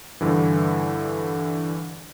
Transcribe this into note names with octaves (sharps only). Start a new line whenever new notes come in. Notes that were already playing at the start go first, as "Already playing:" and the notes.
G2 D3 E3